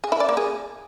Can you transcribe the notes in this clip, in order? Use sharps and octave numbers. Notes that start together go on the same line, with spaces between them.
G#4
E4
D5
A#3
G#4